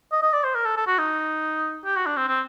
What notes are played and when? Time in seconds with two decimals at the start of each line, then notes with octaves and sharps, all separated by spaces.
0.12 D#5
0.22 D#5
0.33 D5
0.44 C5
0.55 A#4
0.65 A4
0.77 A4
0.87 F#4
0.98 D#4
1.85 G4
1.96 F#4
2.06 D4
2.17 C4
2.28 C4